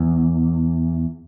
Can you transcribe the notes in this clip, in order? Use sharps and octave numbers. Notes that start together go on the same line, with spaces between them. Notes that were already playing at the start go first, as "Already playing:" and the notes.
Already playing: E2